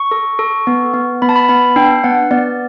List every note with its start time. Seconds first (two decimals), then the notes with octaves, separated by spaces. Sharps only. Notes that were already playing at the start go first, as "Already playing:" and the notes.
Already playing: C#6
0.11 A4
0.39 A4
0.67 B3
0.94 B3
1.22 B3 B5
1.29 A5
1.36 B5
1.48 B3 B5
1.76 D4 G5
2.04 B3 F#5
2.31 B3 D5